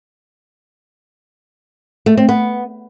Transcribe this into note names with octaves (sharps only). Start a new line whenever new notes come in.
A3
C4
B3